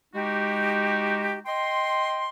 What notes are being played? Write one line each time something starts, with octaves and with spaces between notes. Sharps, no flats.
G#3 D#4 F#4 G4
D#5 G5 C6